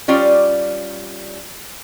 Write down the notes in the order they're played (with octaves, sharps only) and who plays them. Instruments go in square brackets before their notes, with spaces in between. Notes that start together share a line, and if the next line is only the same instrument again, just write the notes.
[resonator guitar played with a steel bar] G3 C#4 F4 D5